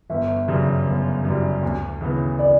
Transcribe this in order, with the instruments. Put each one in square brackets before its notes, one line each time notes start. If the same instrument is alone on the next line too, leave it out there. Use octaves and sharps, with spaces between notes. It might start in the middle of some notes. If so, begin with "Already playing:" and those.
[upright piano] G1 [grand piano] E5
[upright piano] F#2 C#3 G3
G1
F#2 C#3 G3
D2
C#3 E3 B3
[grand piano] D5